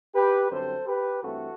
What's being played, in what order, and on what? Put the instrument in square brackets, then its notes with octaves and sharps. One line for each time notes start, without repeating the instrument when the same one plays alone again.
[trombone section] G4 B4
F#2 D3 G3 C4 A4 C5
G4 B4
G2 E3 A3 C4 F#4 A4